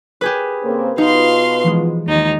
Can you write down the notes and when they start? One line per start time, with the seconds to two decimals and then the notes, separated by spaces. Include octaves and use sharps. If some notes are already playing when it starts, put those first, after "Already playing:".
0.21 G4 G#4 B4
0.63 C#3 A#3 C4
0.98 B2 D#4 F4 B4 F5 C6
1.64 E3 F3 G#3
2.06 D#2 D#4